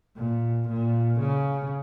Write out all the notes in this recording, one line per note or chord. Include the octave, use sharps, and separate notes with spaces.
A#2
A#2
C#3